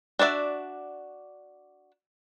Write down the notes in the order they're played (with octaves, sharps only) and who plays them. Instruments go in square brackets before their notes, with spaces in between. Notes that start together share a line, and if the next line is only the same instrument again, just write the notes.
[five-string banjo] D4 F#4 D5 E5